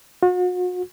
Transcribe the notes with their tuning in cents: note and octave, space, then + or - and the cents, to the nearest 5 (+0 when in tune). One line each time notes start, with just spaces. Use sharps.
F#4 -40